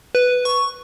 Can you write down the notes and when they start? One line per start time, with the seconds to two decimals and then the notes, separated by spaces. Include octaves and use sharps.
0.15 B4
0.45 C#6